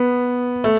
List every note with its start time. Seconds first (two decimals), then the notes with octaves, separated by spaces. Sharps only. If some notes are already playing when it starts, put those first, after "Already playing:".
Already playing: B3
0.64 A3